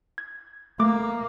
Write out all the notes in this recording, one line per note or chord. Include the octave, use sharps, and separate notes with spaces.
G#6
A3 A#3 D6